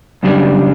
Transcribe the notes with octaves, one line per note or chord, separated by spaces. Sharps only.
F#2 C#3 G3 D4